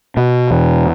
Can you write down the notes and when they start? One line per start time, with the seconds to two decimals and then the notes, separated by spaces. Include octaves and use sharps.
0.17 B2
0.50 E2